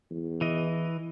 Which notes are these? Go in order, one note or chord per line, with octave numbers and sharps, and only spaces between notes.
E2
E3 D#5